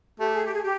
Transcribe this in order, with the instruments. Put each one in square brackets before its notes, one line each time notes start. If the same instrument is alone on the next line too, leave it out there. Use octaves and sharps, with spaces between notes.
[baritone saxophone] A3 [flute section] G4
[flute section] G#4
G4
G#4
G4